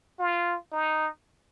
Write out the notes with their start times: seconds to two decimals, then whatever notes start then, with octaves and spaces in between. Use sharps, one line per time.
0.19 F4
0.72 D#4